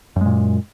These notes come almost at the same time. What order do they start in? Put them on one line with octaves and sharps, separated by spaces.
F#2 G#3 A#2